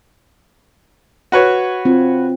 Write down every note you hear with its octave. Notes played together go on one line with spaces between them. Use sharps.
F#4 B4 C#5
C4 F4